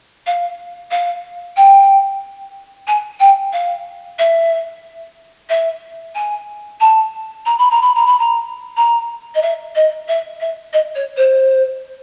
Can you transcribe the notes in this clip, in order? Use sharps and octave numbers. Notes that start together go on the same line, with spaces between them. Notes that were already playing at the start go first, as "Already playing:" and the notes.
F5
F5
G5
G#5
G5
F5
E5
E5
G#5
A5
A#5
B5
A#5
B5
A#5
B5
A#5
A#5
D#5
E5
D#5
E5
E5
D#5
C#5
C5